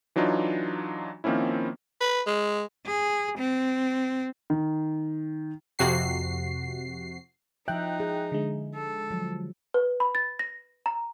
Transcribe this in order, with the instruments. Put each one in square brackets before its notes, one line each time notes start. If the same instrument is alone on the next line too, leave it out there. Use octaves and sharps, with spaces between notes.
[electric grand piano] E3 F#3 D4 D#4 F4
D#3 F3 A#3 C4 C#4 E4
[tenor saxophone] B4
G#3
[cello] G#4
C4
[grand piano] D#3
[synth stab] F2 C3 F#4 C7
[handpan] F3 E5 [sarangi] D#4 [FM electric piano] G5 F#6
[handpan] G#4
[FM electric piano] D3 G#3
[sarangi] A4
[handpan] F3 F#3
[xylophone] B4
B5
A6
A#6
A#5